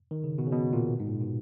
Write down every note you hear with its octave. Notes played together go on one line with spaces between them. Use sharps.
D#3
C#3
B2
C#3
B2
A#2
G#2
A#2
B2